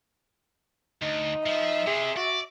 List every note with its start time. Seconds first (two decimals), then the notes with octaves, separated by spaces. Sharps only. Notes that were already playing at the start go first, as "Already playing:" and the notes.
1.02 D2 D#4
1.46 F3 E5
1.87 C3 G#4
2.17 F#4 D5